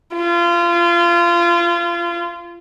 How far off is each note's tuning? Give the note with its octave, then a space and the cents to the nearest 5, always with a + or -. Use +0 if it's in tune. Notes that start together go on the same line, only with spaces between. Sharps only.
F4 -25